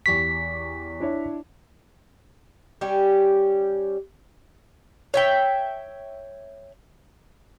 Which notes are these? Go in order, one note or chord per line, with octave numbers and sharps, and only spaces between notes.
E2 G4 C#6 B6
D4 E4 C#5
G3 C#4 G4
C#5 E5 G5